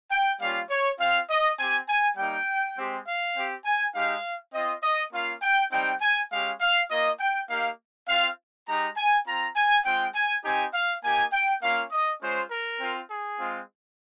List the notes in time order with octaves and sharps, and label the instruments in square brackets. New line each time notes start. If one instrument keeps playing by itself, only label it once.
[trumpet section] G5
G3 A#3 C#4 F4 F5
C#5
C4 F4 F5
D#5
C4 G4 G#5
G#5
G3 A#3 D#4 G5
G#3 C4 G4
F5
C4 G4
G#5
G#3 D#4 G4 F5
C4 F4 D#5
D#5
A#3 C#4 F4 F5
G5
G3 C4 D#4 G5
G#5
G#3 C#4 G4 F5
F5
A#3 F4 D#5
G5
A#3 D#4 G4 F5
C4 F4 F5
G#3 D#4 G4 A#5
G#5
C4 F4 A#5
G#5
G#3 C4 F4 G5
G#5
C4 D#4 G4 G#5
F5
A#3 D#4 G4 G#5
G5
A#3 C#4 F4 F5
D#5
G#3 C#4 F4 C5
A#4
C4 F4
G#4
G#3 C4 F4